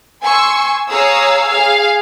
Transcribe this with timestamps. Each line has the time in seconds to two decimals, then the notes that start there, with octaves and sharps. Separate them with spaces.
0.22 G#5 C6 C#6 E6
0.89 G#4 C#5 F5 A#5 D#6 E6
1.50 G#4 F5